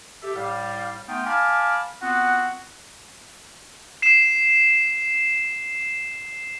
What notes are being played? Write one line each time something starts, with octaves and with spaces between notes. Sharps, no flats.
G4 A4 E5
A2 G3 F5
A3 B3 D#4 F4 G5
F5 G#5 A5 B5 D6 F6
B3 C4 F4 F#4 F#5
C7 E7